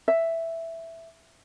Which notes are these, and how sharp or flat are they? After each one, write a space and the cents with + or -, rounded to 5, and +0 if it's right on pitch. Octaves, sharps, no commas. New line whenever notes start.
E5 +5